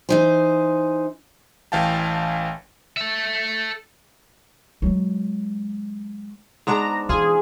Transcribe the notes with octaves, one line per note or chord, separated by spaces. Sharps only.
E3 D#4 C5
A1 E3 F5 G5 A5
A4 E5
F#3 G#3
G#2 B3 D4 A#5
E3 F4 G#4